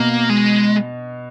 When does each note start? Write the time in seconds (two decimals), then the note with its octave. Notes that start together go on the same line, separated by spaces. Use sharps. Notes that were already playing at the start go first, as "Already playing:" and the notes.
Already playing: B2 A#3
0.30 G#3